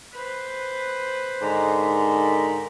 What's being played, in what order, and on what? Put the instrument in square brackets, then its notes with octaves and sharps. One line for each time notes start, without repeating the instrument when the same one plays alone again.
[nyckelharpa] B4 C5
[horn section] G#2 D3 D#3